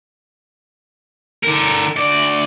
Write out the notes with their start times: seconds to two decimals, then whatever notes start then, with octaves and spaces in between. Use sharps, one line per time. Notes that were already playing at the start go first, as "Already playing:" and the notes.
1.43 D3 A#4
1.96 D2 D5